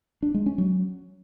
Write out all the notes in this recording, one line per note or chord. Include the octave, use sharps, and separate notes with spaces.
D4
G#3
C#4
F#3